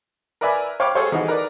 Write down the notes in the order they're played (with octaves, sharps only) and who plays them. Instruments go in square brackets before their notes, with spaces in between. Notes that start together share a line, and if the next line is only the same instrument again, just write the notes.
[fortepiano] A#4 B4 D5 E5 G#5 B5
C#5 F5 G5 B5 D6
G#4 A4 C5 C#5 F5
E3 D#4 F#4 G#4 A4
A#4 B4 D5